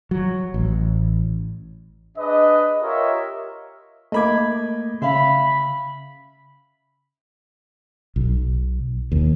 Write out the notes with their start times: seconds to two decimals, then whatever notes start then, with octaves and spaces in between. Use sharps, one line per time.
0.11 F#3
0.54 A1
2.18 D4 G#4 B4 D#5
2.82 F4 G4 A#4 C#5 D#5 E5
4.12 A3 A#3 D#5 B5 D6 G#6
5.02 C#3 E5 F5 B5
8.16 B1
9.12 D#2